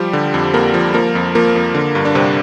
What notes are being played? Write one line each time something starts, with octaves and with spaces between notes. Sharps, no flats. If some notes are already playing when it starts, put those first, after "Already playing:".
Already playing: F3 G3 G4
D3
F2
F2 A#3 A#4
F3
F3 A#3 A#4
F2
F3 A#3 A#4
F2
D3
G2
D4
G2 C3 C4